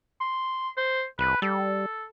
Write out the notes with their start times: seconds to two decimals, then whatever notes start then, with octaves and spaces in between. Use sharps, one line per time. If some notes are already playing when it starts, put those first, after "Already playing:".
0.21 C6
0.77 C5
1.19 C2 B4
1.42 G3 A4